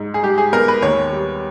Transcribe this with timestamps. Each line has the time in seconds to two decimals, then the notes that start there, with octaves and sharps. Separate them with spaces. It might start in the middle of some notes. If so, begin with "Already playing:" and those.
Already playing: G#2
0.14 G#4
0.23 G#3 G4
0.38 G#4
0.53 B3 A#4
0.68 B4
0.82 D#2 C#5
1.12 G3